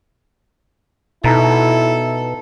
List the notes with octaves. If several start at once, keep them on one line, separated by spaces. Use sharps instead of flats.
B2 D#4 E4 A4 A#5 A6